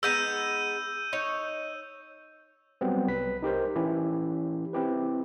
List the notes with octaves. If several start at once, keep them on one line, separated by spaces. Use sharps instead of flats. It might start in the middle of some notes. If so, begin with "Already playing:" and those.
G#3 B3 D#4 E6 G6 D#7
D#4 C#5
F#3 G3 B3 C4
C2 B4 B6
D#4 G4 A#4 C5
E3 C#4 E4 G4
C4 E4 G4 B4